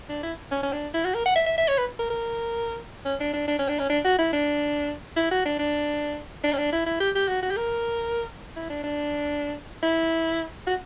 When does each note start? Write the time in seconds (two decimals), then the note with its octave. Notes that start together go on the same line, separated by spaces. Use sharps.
0.09 D4
0.23 E4
0.52 C#4
0.63 C#4
0.73 D4
0.94 E4
1.05 F#4
1.14 A#4
1.26 F#5
1.36 E5
1.46 E5
1.58 E5
1.68 C#5
1.78 B4
1.99 A#4
2.10 A#4
3.05 C#4
3.20 D4
3.33 D4
3.48 D4
3.59 C#4
3.68 D4
3.79 C#4
3.90 D4
4.05 F#4
4.19 E4
4.33 D4
5.17 E4
5.32 F#4
5.45 D4
5.59 D4
6.44 D4
6.53 C#4
6.58 D4
6.73 E4
6.87 E4
7.00 G4
7.15 G4
7.28 F#4
7.43 F#4
7.51 G4
7.57 A#4
8.56 E4
8.70 D4
8.84 D4
9.83 E4
10.67 F#4